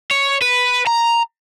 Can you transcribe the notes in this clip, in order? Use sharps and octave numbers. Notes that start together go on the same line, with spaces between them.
C#5
B4
A#5